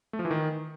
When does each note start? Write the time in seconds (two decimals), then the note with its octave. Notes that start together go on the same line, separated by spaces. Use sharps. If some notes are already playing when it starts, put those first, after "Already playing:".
0.13 A3
0.19 F3
0.25 E3
0.31 D#3